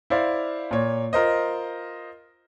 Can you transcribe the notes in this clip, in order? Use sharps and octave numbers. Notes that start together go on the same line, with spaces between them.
E4 C5 D5 F5
A#2 C#5
F4 A#4 C5 D#5